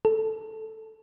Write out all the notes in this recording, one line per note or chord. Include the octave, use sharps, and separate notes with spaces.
A4